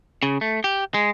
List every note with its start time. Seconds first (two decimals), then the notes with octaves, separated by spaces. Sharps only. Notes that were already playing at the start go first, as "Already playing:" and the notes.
0.23 C#3
0.41 A3
0.64 G4
0.94 G#3